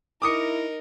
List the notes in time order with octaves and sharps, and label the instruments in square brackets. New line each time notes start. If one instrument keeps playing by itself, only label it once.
[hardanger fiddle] D#4 A#4 [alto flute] E4 [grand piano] D6 D#6 C#7